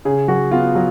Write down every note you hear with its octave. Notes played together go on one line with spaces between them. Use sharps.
C#3 G#4
F#3 F#4
B3 F4
F#3